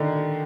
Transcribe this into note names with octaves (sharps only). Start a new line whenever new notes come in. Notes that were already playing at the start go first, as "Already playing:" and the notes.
Already playing: D3 D#3